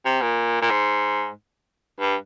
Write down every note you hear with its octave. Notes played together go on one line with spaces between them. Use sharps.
C3
A#2
A#2
G#2
G2